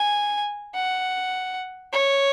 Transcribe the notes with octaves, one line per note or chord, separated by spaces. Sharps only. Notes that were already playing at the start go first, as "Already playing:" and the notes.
Already playing: G#5
F#5
C#5